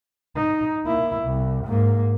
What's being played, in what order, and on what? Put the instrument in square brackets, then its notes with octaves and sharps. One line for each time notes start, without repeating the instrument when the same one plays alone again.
[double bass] D#4
A#3 E4
C2
G#2 A#3